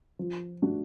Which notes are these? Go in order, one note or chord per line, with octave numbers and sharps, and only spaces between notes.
F3
A3 D4 F#4